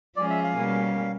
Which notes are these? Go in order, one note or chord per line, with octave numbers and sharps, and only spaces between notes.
F3 G#3 C#4 F4 G#4 D5
E5
F5
B2 G3 A#3 C#4